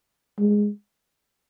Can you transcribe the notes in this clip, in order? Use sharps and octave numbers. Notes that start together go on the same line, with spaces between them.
G#3